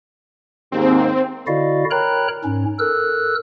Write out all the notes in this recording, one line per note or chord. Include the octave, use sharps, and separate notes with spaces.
D#2 G#2 C4
D3 E4 F#4 D5 D#5 F5
A#4 C#5 G5 A#5 B5 F#6
G#2 C#4
A4 A#4 E6 F#6